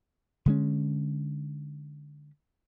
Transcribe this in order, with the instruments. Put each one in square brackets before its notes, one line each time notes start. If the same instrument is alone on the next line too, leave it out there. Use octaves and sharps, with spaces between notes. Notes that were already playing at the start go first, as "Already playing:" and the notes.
[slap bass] D3 G#3 C#4